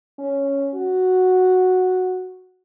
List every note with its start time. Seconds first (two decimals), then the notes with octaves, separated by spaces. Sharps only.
0.19 C#4
0.75 F#4